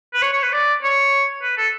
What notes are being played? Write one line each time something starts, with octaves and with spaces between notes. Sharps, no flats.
B4
C#5
C#5
B4
D5
C#5
B4
A4